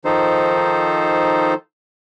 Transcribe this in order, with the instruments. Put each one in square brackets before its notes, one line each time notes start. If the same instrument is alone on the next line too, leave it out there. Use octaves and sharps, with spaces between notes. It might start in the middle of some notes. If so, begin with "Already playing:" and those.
[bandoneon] D#3 F3 D#4 A4 C5